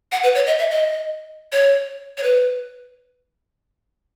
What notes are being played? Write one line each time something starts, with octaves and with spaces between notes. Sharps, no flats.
F#5
B4
C#5
D#5
E5
D#5
C#5
C#5
B4